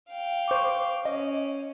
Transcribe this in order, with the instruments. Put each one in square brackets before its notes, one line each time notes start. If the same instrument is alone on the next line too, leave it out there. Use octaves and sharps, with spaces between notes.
[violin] F5 G5
[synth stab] C5 C#6 D6
[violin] C#4 [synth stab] D#5